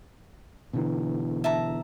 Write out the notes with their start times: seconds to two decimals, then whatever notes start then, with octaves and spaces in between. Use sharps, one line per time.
0.73 B2 D3 E3
1.44 E5 A5 A#5